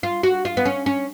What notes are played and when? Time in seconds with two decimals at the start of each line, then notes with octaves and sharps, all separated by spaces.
0.03 F4
0.23 F#4
0.45 F4
0.57 B3
0.65 C#4
0.86 C#4